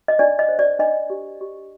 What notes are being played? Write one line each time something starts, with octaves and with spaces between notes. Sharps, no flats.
D#5
D4 D5
D#5
C5
D5
D4 D#5
G4
G4